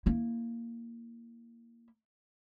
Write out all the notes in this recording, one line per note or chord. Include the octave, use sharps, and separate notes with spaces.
A#3 E4